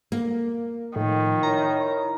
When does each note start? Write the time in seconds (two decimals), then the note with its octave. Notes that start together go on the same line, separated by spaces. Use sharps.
0.12 A#3
0.96 A2 D#3 F3
1.43 E4 A#4 C#5 A#5